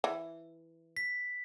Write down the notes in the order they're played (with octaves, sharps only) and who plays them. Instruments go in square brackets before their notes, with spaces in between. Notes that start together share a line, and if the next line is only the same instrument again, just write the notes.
[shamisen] E3
[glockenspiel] B6